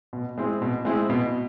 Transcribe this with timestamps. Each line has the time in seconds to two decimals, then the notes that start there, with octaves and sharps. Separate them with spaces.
0.13 B2
0.38 G#3 C4 E4
0.62 B2
0.85 G#3 C4 E4
1.10 B2